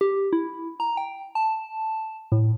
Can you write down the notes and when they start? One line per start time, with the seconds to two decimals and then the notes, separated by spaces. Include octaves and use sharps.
0.01 G4
0.33 E4
0.80 A#5
0.97 G5
1.35 A5
2.32 A2